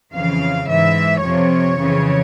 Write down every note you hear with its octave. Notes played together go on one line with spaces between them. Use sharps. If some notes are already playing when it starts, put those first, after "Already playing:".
F2 C#3 E3 F5
G#2 E3 E5
F2 C3 F3 C#5
F2 C#3 E3